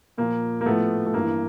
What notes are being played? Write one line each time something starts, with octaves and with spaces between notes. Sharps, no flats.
A#2 F3 A#3
A#3
A2 F3 A3 B3
A3
G2 E3 A#3